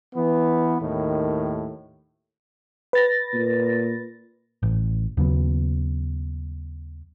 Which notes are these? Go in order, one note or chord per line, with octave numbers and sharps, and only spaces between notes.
E3 B3
D#2 A2 D#3
B4 A6 A#6
A#2
A1
D#2 C#3 F#3 B3